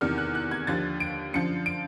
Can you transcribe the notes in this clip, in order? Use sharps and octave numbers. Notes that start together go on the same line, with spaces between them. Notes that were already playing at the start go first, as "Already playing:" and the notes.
E2 C3 D#3 F6
F#6
F#6
G#6
D#2 D3 F3 A6
D7
F#2 D3 F3 C#7
D7